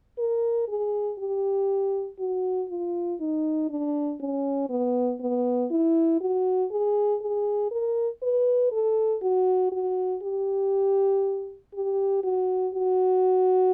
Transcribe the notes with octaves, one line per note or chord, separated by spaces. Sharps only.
A#4
G#4
G4
F#4
F4
D#4
D4
C#4
B3
B3
E4
F#4
G#4
G#4
A#4
B4
A4
F#4
F#4
G4
G4
F#4
F#4